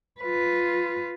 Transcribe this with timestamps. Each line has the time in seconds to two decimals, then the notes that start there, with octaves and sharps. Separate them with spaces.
0.21 F4 B4